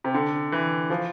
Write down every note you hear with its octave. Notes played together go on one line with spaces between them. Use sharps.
C3
D3
E3
F3